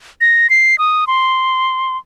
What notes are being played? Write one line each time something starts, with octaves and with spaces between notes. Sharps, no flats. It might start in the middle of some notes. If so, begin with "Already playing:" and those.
A#6
C7
D#6
C6